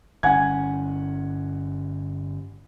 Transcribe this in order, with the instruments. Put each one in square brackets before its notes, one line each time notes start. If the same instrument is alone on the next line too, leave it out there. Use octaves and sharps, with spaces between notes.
[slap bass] G1 C#4 [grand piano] F#5 G#5 G#6